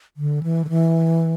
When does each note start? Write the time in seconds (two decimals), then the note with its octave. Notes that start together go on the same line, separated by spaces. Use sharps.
0.17 D3
0.43 E3
0.65 D3
0.69 E3